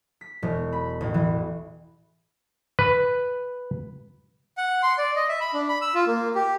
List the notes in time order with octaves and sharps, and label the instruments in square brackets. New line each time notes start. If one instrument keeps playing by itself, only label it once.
[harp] B6
E1
B5
A1
E3
[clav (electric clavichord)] B4
[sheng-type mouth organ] F#5
C6
D5
D#5
E5
B5
D4
B5
E6
F4
A#3
G4